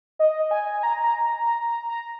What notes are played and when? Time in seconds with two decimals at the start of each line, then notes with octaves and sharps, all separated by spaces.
0.19 D#5
0.51 G#5
0.83 A#5
1.04 A#5
1.25 A#5
1.46 A#5
1.68 A#5
1.89 A#5